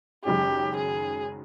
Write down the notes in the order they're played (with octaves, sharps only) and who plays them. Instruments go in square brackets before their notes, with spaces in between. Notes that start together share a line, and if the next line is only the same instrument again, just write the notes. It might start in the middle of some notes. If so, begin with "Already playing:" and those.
[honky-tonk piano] F#1 F#2 D#3 G#3 C#4 [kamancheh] G4
[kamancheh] G#4